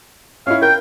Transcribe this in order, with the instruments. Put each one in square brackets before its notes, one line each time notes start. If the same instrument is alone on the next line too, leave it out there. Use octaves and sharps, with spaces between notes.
[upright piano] C#4 D#4 E4 [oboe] F5
[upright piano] A#4 G6 [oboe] G5